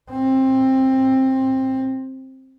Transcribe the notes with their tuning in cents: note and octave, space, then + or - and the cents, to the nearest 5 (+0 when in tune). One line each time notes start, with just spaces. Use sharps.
C4 +15